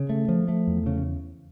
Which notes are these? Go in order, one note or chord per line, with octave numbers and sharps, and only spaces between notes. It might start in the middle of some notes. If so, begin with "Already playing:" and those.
Already playing: C#3
A3
F3
A3
E2
C#3